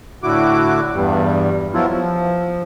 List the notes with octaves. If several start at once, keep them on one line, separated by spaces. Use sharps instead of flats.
A2 D3 E4 F#4 D6
E2 G2 G3
F3 F#3 B3 E4 F4
F3